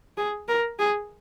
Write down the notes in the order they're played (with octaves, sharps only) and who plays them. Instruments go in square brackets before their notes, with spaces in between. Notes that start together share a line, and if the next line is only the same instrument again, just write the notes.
[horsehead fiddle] G#4
A#4
G#4